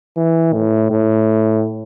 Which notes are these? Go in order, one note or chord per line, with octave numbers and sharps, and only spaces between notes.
E3
A2
A2